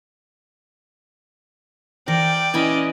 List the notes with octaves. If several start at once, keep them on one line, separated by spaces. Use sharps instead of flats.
E3 A#4 C5 D5 G5
A#2 E3 C#4 D#5 G#5 B5